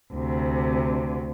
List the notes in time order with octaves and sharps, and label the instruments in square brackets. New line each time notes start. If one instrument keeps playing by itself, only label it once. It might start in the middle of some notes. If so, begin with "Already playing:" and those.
[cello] D2 C3